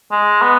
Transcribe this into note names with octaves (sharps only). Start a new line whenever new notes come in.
G#3
B3